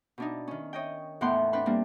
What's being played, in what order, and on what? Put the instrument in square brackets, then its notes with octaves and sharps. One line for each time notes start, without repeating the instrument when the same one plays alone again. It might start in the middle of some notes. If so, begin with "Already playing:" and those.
[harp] B2 D4 D#4
D#3 C#4
C#5 D#5 G5
E2 A2 B3 F#5 G5 C6
C4 D4 B4 F#5 C6
G3 A#3 C4 D4